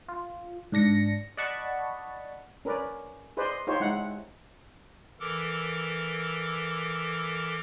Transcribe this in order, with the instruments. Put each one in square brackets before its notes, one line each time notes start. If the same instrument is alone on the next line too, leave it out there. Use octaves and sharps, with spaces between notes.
[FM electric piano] F4
G#2 D4 A#6 C#7
D5 D#5 F#5 A5 B5 C#6
[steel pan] C#4 A#4 B4 D5
G#4 B4 C5 D5 D#5
D#4 F4 G4 C5 C#5
G#3 D#4 E4 F#5
[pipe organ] E3 A4 A#4 D6